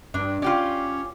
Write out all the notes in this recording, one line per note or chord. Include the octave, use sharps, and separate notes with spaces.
G2 D4
C#4 F4 G4 D5